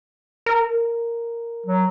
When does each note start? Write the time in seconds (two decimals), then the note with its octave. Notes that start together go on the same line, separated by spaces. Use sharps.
0.46 A#4
1.66 F#3